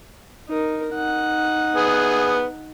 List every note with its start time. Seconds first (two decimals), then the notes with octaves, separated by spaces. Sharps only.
0.49 D#4 A#4
0.94 D#4 F#5
1.76 B3 G#4